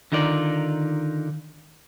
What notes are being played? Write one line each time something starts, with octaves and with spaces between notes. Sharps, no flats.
D3 D#3 D#4 F4 A#4 D5